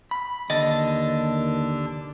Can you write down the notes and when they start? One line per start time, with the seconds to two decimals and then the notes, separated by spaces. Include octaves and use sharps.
0.11 B5
0.50 D#2 D3 D#5 A5